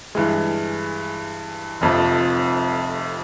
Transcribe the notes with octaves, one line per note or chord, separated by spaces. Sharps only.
G2 E3 G#3
F1 F2 C3 F3